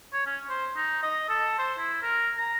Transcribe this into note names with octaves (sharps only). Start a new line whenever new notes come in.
C#5
C#4
C5
D#4
D#5
A4
C5
E4
A#4
A#5